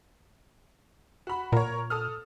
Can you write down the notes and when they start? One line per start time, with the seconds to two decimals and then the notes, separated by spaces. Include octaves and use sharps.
1.27 F#4 B5
1.52 A#2 A#4 C#5
1.90 A4 D#6 F6